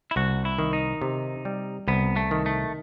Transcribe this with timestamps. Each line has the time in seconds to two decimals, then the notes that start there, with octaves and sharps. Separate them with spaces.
0.11 E4
0.16 C2 F#4
0.45 E4
0.59 D#3
0.73 D#4
1.02 C3
1.45 G3
1.88 C2 B3
2.16 A3
2.31 D#3
2.46 A3